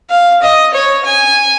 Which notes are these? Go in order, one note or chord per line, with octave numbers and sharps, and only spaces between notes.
F5
D#5
C#5
G#5